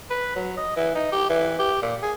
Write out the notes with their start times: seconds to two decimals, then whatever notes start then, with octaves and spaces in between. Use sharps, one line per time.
0.10 B4
0.36 F#3
0.57 D#5
0.76 E3
0.95 D#4
1.12 G4
1.30 E3
1.59 G4
1.82 A#2
2.02 G#4